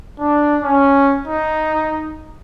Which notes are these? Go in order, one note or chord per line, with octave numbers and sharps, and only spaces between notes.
D4
C#4
D#4